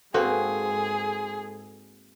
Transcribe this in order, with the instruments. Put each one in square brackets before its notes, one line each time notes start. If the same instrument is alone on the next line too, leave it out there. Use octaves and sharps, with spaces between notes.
[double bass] G#2 [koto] A#3 C4 F#4 [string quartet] G#4 [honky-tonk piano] A4 B4 G#5